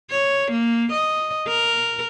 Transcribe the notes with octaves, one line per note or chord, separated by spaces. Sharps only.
C#5
A#3
D#5
A#4